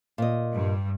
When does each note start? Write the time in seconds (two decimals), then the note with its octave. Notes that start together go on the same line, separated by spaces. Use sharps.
0.18 A#2 D#5
0.55 G2